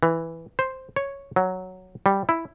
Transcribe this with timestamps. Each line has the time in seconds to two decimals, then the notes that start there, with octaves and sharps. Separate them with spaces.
0.03 E3
0.59 C5
0.96 C#5
1.36 F#3
2.06 G3
2.29 E4